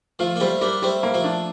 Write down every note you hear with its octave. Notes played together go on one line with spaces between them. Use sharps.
F3 A3 F4
A#3
G3 A3 C4
G3 A#3 D4
G3 A3 C4
A#3
F3 A3
D4